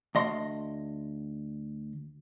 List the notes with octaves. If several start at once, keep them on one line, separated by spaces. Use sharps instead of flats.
D2 D#5 C6